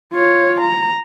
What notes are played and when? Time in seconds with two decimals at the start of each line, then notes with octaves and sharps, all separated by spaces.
0.14 F4 C#5
0.61 A#5